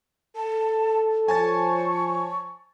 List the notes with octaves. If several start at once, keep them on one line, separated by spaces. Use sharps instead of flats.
A4 A5
F3 C5 C#5 G#5 A5 C#6 A6